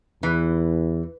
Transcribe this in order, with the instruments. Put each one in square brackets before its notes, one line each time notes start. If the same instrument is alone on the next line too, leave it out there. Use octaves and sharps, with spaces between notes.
[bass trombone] E2 [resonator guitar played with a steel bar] E3